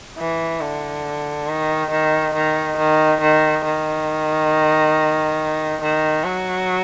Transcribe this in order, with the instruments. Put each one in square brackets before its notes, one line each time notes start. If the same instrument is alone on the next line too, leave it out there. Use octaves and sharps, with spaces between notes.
[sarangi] E3
D3
D#3
D#3
D#3
D#3
D#3
D#3
D#3
F#3